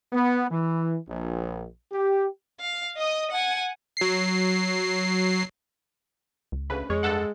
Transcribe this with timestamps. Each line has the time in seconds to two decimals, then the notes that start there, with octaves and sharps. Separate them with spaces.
0.13 B3
0.50 E3
1.09 A#1
1.92 G4
2.60 F5
2.97 D#5 D#6
3.31 F#5 G#5
3.97 F#3 C7
6.52 C#2
6.70 D2 C#3 B4
6.90 F2 G#3 C#5
7.03 G2 A4 F#5